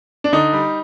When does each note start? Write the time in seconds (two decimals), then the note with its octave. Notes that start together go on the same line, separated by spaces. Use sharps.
0.24 D4
0.33 D3 D#4
0.53 G3